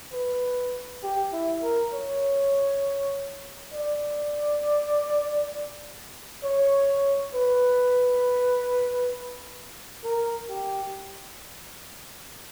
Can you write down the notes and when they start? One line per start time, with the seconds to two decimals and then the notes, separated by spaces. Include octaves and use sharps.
0.13 B4
1.03 G4
1.33 E4
1.63 A#4
1.93 C#5
3.73 D5
6.43 C#5
7.34 B4
10.04 A#4
10.49 G4